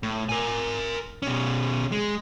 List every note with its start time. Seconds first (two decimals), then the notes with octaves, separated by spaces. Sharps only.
0.03 A2
0.29 A#4 G#5
1.22 B2 C#4
1.92 G#3